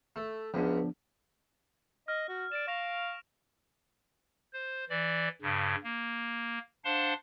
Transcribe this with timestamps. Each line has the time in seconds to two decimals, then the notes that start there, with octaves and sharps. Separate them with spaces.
0.16 A3
0.54 C#2 F#2 F3 B3 D4
2.08 D#5 F6
2.29 F#4
2.52 D5 D7 E7
2.68 F5 C#6 A#6 F7
4.53 C5
4.89 E3 D5
5.42 G2 C#3
5.84 A#3
6.85 D4 C5 F5 F#5 A5 C6